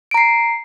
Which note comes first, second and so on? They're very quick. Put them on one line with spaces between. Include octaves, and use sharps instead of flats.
D7 A#5 C7